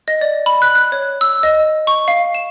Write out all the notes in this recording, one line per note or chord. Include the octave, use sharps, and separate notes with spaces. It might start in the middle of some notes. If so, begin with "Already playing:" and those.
D#5
D5
B5
F#6
F#6
C#5
E6
D#5
C#6
F5
E7